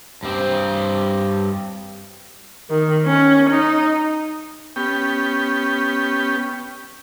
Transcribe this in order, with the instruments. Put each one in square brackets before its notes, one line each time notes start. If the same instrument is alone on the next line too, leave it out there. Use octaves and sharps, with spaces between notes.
[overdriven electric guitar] G2 C4
[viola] D#3
C#4
D#4
[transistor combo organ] B3 C#4 G4 G5